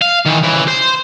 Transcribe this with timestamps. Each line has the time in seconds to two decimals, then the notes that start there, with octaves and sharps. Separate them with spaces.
0.02 F5
0.26 D#3 E3
0.43 C#3 E3
0.68 C5